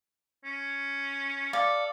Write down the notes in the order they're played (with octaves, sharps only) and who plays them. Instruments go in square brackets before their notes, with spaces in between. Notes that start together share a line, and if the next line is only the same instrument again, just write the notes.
[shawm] C#4
[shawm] A4 [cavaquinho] D5 F5